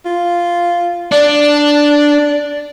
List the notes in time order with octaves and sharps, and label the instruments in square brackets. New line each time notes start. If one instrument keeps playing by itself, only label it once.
[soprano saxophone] F4
[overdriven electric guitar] D4 [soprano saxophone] D5